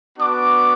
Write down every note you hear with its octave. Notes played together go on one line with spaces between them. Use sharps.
B3 D4 F#4 D6